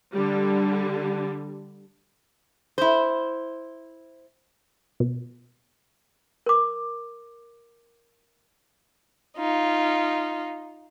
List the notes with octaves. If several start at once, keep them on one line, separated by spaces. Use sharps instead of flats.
D3 G3
E4 C5
B2
A#4 D6
D#4 F4